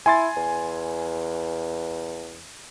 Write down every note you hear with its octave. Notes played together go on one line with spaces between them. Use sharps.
E4 G#5 C6 A6
E2